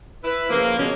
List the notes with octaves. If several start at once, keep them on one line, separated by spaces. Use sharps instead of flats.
E4 B4
C#3 F3 A#3
B2 G3 G#3 C#4